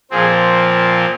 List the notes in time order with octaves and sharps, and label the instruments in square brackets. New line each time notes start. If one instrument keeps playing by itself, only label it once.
[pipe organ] A#2 F3 C4 G#4